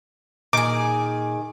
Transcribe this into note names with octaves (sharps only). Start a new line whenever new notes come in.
A#2 D#3 G#4 A#5 D6